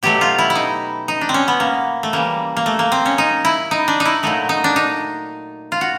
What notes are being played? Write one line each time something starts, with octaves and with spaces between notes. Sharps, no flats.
B2 F#3 A3 G4
F4
E4
E4
D#4
D#4
D4
C4
C#4
B3
A#3
A3
C#3 E3 G3 A#3
A#3
A3
A#3
C4
C#4
D#4
E4
D#4
D4
D#4
E4
A#2 F#3 A3 D#4
D#4
D4
D#4
F4
F#4